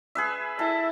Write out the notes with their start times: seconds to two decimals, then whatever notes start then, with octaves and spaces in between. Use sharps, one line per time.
0.15 G#4 B4 E5
0.59 E4 A4